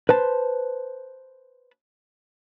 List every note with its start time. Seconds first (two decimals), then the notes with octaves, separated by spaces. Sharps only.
0.09 B4 C5 A5